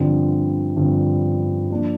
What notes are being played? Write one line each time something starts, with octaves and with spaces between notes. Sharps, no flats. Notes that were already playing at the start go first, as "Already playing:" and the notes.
Already playing: G2 D3 F3 C4 F4
G2 D3 F3 C4 F4
F3 A#3 D4